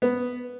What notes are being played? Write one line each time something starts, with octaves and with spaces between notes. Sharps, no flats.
B3